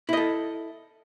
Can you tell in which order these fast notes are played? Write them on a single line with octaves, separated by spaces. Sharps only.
E4 D#5 A4